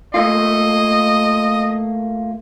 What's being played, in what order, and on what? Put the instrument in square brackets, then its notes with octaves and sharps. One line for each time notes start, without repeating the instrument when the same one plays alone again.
[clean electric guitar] A3 A#3 F4 [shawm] D#5